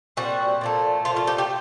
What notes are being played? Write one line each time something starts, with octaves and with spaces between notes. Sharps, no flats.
A#2 G3 C4 F#4
A#2 F3 A3
A#2 F3 A3 F4
F4
G4
G4